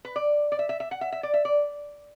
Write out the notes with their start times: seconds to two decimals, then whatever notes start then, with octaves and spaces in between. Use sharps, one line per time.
0.05 B4
0.16 D5
0.52 D5
0.59 E5
0.69 E5
0.80 E5
0.91 F#5
1.01 E5
1.12 E5
1.23 D5
1.34 E5
1.45 D5